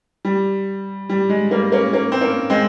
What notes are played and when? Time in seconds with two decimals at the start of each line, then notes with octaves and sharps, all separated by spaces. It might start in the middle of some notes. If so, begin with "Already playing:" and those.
0.25 G3
1.09 G3
1.29 G#3
1.51 G3 A#3
1.72 A#3 C#4
1.93 A#3 C#4
2.12 C4
2.21 A#3 C#4
2.50 G#3 C4